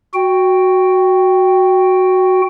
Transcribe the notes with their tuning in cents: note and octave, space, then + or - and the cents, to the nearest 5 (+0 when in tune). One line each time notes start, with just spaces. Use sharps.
F#4 +0 G5 +0